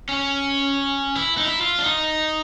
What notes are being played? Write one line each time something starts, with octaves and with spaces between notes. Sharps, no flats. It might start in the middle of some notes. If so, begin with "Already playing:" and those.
C#4
E4
D#4
E4
F4
D4
D#4